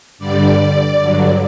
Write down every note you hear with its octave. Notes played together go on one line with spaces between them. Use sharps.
G2 D3 G3 D5
G2 D3 F#3